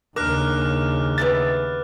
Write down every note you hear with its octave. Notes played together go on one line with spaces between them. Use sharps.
D#2 C#3 D4 A#4 D6 F6 F#6
B3 D5 E5 A6